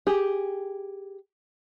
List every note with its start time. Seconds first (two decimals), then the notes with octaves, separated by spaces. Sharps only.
0.07 G4 G#4